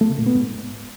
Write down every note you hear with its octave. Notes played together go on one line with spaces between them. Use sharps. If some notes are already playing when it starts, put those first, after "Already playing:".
A3
C#3
A#2
B3
G#2